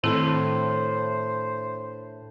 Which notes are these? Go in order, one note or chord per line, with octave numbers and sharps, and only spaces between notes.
A2 D#3 C4 D4 E4 A4 B4 C5